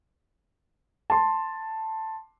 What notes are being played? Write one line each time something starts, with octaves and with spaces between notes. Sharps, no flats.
A5 C6